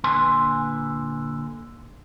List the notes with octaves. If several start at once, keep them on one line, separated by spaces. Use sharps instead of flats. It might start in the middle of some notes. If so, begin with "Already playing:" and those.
A#2 D3 B4 G#5 C6